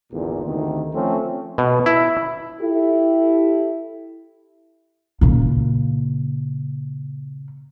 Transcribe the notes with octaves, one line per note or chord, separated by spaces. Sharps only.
G#1 E2 A#2 D3
D2 C3 D#3
F3 A3 C4 C#4
B2
E4
E4 G4 A4
A#2 C#3